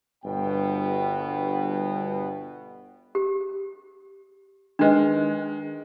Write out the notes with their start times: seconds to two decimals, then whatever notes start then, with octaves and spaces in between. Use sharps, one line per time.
0.24 G1 G2 B2 B3 F#5 G5
3.15 G4
4.79 D#3 G#3 D4 D#4 B4